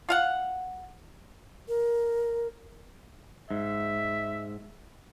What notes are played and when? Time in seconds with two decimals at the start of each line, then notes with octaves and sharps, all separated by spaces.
0.09 F4 F5 F#5
1.68 A#4
3.51 G#2 E5